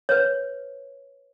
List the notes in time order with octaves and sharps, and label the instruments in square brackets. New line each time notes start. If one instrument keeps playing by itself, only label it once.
[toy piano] B4 C#5